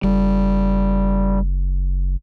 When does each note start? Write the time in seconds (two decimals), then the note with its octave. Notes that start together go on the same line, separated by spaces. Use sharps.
0.03 F#1 G3